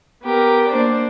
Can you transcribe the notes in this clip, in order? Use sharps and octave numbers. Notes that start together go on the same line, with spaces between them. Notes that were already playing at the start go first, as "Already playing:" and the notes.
B3 G4 A#4
A#3 D4 C5 D5